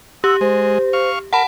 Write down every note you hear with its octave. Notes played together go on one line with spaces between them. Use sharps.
G4 F#5 E6
G#3 C5
F5 C#6
A#4 F#5 A5 B5